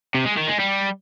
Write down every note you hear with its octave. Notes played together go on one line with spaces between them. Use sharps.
C3
G#3
D#3
G#3
G3